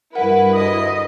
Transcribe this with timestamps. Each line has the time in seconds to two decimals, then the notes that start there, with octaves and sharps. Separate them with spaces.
0.15 G2 E4 A#4 B4 F#5
0.55 D2 D#5 B5 D#6